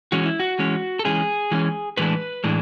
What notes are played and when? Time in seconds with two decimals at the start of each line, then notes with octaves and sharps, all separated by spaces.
0.12 E3 G#3 C#4 F#4
0.26 E4
0.40 F#4
0.59 E3 G#3 C#4
0.99 A4
1.05 E3 G#3 C#4 G#4
1.51 E3 G#3 C#4
1.97 A2 E3 G#3 D4 B4
2.44 A2 E3 G#3 D4